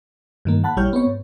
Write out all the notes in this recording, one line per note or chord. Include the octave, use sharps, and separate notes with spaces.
G2 D#3 A#3
F#5 A5 B5 F#6
A#1 G3 E4 C#5 F6 G6
B3 C4 C#5
G#2